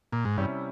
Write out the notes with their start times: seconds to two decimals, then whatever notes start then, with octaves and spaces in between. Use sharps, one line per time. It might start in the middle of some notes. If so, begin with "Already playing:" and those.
0.12 A#2
0.25 G#2
0.37 G2 C3 G3 C#4 E4